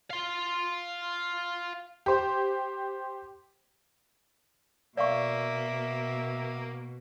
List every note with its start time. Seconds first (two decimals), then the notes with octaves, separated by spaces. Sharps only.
0.11 F5 C6
2.06 G4 C5
4.97 B2 A#3 D5 E5 F5 C#6